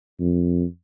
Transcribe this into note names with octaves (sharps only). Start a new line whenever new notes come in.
F2